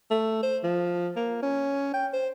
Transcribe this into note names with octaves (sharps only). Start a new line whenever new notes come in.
A3
C5
F3
A#3
C#4
G5
C5